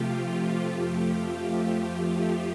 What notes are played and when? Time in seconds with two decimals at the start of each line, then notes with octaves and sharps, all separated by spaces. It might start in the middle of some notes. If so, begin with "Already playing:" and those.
Already playing: C3 F3 A3 F4 G4
0.11 G4
0.40 F4
0.69 F2 F3 A3 G4
0.98 F4
1.27 G4
1.56 G4